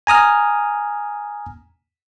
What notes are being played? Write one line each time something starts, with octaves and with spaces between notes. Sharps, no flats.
G#5 A#5 D#6 F6